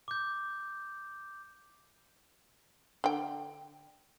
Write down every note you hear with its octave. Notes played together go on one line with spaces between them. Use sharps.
D6 G6
D3 G5